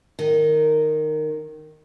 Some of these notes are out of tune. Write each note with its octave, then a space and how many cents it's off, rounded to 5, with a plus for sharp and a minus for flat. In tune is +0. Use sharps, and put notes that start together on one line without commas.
D#3 -15